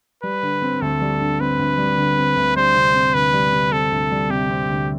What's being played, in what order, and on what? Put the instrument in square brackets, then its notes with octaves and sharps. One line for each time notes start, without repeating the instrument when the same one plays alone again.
[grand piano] G3 [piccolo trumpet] B4
[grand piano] D3
C4
[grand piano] D2 [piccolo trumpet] A4
[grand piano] G3
D3
[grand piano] C4 [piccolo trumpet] B4
[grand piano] D2
G3
D3
C4
D2
[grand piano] G3 [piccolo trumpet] C5
[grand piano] C3
C4
[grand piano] D2 [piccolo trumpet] B4
[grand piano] G3
C3
[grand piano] C4 [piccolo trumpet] A4
[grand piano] D2
G3
[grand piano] C3 [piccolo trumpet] G4
[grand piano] C4
D2